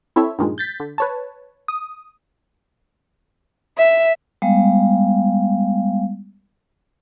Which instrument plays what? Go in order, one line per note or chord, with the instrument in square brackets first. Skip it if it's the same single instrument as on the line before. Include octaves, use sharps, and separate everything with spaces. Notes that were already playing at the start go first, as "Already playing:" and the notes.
[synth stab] C4 E4 A4 C#5 E5
G2 A#2 D#3 F3 G#3
G6 A6 B6
D3
B4 C#5 A5
D#6
[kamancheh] E5
[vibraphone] G3 G#3 B3 F5